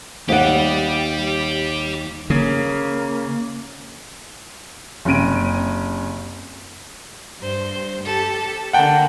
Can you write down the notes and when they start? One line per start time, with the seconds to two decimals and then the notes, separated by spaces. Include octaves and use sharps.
0.29 D#2 G4 D5 F#5
2.30 C#3 A#3
5.05 F#1 C3 C#4 D7 D#7
7.39 G2 C5
8.03 G4 A4 A5
8.73 D3 A#3 F#5 G5 A5